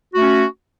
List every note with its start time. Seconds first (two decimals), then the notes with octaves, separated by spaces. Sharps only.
0.13 F#4
0.17 A3
0.21 C#4